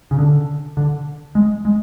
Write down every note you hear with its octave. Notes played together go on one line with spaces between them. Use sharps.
C#3
D3
D3
G#3
G#3